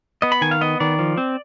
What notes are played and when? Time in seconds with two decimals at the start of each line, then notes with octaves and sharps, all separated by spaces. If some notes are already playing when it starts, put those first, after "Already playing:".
0.22 B3 D#5
0.32 B5
0.41 D#3 G#5
0.51 F5
0.61 B3 D#5
0.80 D#3 D5
0.99 F3
1.18 C4